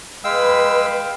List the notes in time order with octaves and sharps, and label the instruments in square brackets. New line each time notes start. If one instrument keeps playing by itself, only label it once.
[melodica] G#3 E6 [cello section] B4 [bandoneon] F5 G5